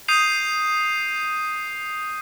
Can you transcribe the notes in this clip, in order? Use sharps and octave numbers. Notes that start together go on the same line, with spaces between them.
D#6 G6 C7 D#7 F7